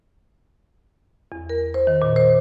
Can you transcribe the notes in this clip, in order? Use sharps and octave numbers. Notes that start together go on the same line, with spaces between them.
E2
A#4
C5
D#3
A#2
C5